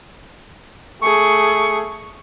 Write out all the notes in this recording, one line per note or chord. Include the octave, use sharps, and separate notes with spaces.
A3 G#4 C#6